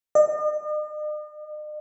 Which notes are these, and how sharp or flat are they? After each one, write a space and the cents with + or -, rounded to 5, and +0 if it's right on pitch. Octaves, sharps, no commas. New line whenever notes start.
D#5 -45